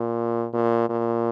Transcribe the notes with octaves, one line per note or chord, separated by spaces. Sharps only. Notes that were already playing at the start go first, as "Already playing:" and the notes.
Already playing: A#2
A#2
A#2